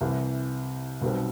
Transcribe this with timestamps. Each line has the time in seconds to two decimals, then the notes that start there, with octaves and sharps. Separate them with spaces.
0.01 C2 C3 E3
1.01 B1 B2 G3 C4